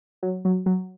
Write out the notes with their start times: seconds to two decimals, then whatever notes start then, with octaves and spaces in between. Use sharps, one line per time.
0.23 F#3
0.45 F#3
0.66 F#3